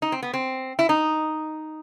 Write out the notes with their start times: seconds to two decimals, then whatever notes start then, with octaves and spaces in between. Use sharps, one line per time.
0.02 D#4
0.12 C4
0.22 B3
0.34 C4
0.79 E4
0.89 D#4